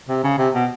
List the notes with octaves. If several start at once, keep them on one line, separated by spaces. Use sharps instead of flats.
C3
C#3
C3
B2